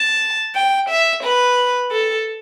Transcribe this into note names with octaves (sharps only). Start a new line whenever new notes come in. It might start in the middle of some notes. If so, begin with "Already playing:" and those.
Already playing: A5
G5
E5
B4
A4